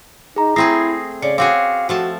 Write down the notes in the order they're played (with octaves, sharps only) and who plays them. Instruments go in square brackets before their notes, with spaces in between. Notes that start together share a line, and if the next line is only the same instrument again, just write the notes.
[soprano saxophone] D#4 [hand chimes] G#4 A#5
[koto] A3 C4 G#4 [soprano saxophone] E4 [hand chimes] D#6 A#6 C7
[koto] C#3 [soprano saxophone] D5 [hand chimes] C#7
[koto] C4 F#4 G#4 [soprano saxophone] F5 [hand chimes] D6 C#7
[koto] F3 A3 A5 [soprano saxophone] F#4